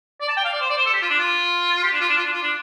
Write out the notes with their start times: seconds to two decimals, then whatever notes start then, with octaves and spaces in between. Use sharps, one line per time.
0.21 D5
0.28 A5
0.37 G5
0.45 F5
0.53 D5
0.61 C5
0.70 D5
0.77 C5
0.86 A4
0.93 G4
1.02 F4
1.10 D4
1.19 F4
1.84 G4
1.93 D4
2.00 F4
2.08 D4
2.17 F4
2.25 D4
2.33 F4
2.42 D4